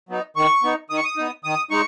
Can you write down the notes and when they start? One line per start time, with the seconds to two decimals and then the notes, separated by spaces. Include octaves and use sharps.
0.09 F#3 B3 D#4
0.36 D#3 C#6
0.63 B3 D#4
0.90 D#3 D#6
0.97 C#6
1.04 D#6
1.17 B3 D#4
1.44 D#3 D#6
1.71 G#3 D#4 C#6